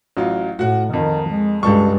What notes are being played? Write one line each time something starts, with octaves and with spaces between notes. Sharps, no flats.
A1 F#3 F4
A2 F#4 F#5
F2 D#3
G#3
C#2 G2 G#3 A4 C#6